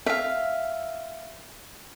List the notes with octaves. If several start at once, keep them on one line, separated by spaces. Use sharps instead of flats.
E5 F5